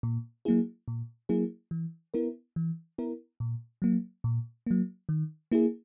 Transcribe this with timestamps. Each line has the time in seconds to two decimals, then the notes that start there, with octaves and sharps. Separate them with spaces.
0.03 A#2
0.45 F#3 A#3 E4 G#4
0.88 A#2
1.29 F#3 A#3 E4 G#4
1.71 E3
2.14 B3 E4 A#4
2.56 E3
2.98 B3 E4 A#4
3.40 A#2
3.82 F#3 A#3
4.24 A#2
4.67 F#3 A#3
5.09 D#3
5.52 A#3 E4 G#4